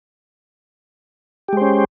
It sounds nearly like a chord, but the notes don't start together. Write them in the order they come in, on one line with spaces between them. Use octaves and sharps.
G4 G#3 C5 C#4